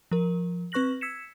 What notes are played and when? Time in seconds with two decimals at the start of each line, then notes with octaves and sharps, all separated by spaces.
0.11 F3 A#4
0.72 C4 B4 C#6 F#6 A#6 F#7
1.01 E6 G#6 B6 C#7 E7